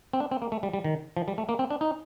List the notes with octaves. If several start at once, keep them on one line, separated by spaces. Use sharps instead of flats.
C4
D4
C4
A#3
A3
G3
G3
D#3
F3
G3
A3
A#3
C4
D4
D#4